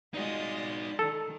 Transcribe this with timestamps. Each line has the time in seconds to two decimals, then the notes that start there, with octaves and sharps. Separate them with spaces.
0.14 G#3 D#4 F4 F#4 D5 D#5
0.99 D#3 A4